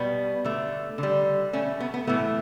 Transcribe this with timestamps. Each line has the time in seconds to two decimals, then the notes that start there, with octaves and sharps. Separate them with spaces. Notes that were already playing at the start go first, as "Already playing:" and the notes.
Already playing: B2 G3 B3
0.44 D3 A3
0.98 D3
1.03 G3
1.53 B2 A3 C#4
1.80 B3
1.94 B3
2.07 A2 E3 A3 B3